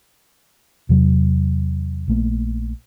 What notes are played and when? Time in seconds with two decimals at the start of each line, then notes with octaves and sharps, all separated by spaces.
0.89 E2 C3 F#3
2.08 A#1 A3 A#3